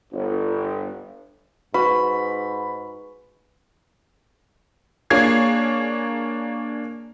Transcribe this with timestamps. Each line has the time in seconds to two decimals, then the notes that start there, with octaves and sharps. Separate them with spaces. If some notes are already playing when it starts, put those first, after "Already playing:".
0.12 G1
1.74 G#2 F#4 B4 B5 C#6
5.10 A#3 D4 G#4 C#5 G#6 C7